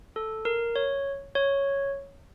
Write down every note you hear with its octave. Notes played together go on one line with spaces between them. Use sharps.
A4
A#4
C#5
C#5